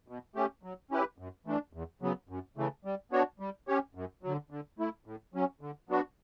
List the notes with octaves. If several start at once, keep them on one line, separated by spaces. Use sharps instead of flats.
B2
A3 C#4 G4
F#3
C#4 E4 G4 B4
F#2
E3 A3 D4
E2
C#3 F#3 B3
F#2
C#3 E3 A3
G3
B3 D4 F#4 C#5
G3
C#4 G4 C#5
F#2
D3 F#3
D3
A3 E4
A2
F#3 C#4
D3
F#3 B3 D4 F#4